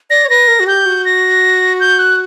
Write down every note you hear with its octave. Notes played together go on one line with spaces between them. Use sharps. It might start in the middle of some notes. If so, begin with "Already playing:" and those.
D5 A#6
C#5
B4 A#6
A#4
F#4
G4 G6
F#4
A#6
G6
F#6